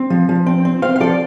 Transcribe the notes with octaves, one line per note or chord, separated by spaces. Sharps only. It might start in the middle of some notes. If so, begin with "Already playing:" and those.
Already playing: C4
F3
F3
C4
C4
C4 C5 F5
F5
F3 A4 D5